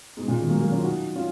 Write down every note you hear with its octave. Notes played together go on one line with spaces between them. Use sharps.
G#2 B2
A#2 C#3
B2 D#3
F#3 A#3
F#3 A#3
C#4 F4
D#4 F#4
C#4 F4